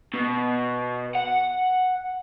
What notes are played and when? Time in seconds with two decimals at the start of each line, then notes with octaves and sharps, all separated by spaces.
0.14 B2
1.15 F#5